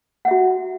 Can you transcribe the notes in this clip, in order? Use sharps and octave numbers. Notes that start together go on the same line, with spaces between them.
F#4 E5 F#5